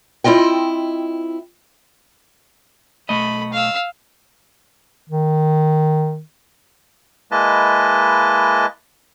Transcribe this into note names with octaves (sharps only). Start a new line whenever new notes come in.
C4 E4 F4 D#5 G5
B1 A3 D#5 B5
F5 E6
D#3
G#3 A#3 E4 B4 D#5 A5